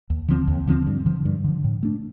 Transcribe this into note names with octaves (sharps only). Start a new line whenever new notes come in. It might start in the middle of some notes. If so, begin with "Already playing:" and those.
D#2
D3 F3 C4
D#2
D3 F3 C4
G2
D3 F3
G2
D3 F3
A2
A3 D4